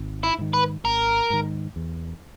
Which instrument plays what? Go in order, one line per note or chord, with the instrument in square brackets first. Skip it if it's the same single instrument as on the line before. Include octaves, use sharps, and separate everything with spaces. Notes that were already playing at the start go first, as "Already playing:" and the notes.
Already playing: [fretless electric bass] G#1
[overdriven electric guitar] E4
[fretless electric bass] G#2 D#3
[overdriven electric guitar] B4
[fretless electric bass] G#1 [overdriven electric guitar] A#4
[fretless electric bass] G#2 D#3
E2